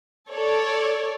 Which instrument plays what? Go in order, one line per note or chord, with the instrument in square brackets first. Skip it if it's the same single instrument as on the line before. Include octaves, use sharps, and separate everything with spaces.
[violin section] A4 C#5 D5